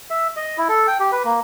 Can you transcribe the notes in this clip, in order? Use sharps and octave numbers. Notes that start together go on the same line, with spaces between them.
E5
D#5
E4
A4
G5
G4
B4
A#3